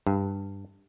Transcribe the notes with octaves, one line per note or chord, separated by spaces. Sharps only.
G2